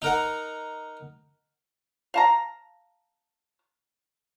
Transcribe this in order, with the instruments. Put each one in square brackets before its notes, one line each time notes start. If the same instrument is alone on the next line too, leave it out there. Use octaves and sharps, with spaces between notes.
[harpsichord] D#4 A#4 F#5
[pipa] F5 A5 A#5